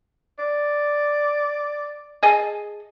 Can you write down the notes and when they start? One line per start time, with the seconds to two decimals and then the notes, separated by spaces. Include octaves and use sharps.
0.39 D5
2.23 G#4 D#5 A5